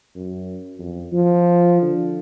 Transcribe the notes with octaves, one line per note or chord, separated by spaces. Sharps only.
F#2
F2
F3
D3